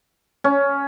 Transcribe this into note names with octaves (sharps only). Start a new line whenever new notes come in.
C#4